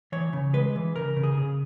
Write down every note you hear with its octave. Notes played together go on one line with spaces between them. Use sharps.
E3 C#5
C#3
G#3 B4
E3
C#3 A#4
C#3
G#4
C#3